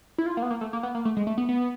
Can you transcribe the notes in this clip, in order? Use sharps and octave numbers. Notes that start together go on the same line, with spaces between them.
E4
F4
A#3
B3
A#3
A3
A#3
B3
A#3
A3
G#3
A3
B3
B3